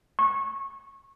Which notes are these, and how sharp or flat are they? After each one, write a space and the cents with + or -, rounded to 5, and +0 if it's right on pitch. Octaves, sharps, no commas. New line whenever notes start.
C#6 -20